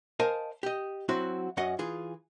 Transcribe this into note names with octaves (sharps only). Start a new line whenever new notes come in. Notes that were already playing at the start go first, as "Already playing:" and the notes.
A#4 C5 D#5 F5 G#5 A5
G4 D#5
F#3 C4 E4 F#4
F#2 F#3 C#4 D#5 F#5
E3 F4 G#4